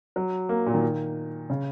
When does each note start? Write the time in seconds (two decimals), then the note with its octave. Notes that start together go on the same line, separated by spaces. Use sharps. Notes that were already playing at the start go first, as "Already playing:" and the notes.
0.16 F#3
0.49 A#3
0.66 A#2
0.74 D#3
1.50 C#3